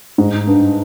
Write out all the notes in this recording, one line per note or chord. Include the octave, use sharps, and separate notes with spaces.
G#2
G2